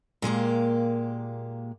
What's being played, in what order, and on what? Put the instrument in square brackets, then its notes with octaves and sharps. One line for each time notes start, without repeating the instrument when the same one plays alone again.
[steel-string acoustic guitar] A#2 G#3 A#3 G4